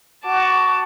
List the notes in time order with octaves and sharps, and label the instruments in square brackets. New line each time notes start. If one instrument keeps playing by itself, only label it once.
[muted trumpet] F#4 [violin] A5 D6